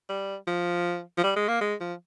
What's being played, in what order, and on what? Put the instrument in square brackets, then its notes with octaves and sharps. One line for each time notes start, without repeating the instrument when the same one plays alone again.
[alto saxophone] G3
F3
F3
G3
G#3
A#3
G#3
F3